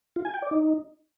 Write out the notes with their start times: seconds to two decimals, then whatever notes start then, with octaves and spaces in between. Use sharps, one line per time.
0.16 F4
0.25 G#5
0.34 G5
0.42 D5
0.51 D#4